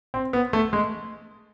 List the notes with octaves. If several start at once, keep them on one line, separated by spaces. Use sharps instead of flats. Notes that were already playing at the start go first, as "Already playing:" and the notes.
C4
B3
A3
G#3